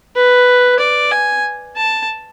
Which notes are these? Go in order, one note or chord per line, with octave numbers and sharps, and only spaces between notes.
B4
D5
G#5
A5